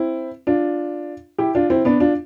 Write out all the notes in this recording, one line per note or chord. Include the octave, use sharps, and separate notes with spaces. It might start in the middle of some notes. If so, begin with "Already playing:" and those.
Already playing: C4 E4
D4 F4
E4 G4
D4 F4
C4 E4
B3 D4
D4 F4